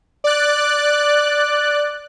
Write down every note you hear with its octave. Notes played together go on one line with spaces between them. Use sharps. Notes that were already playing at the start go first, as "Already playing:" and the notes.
D5 F#6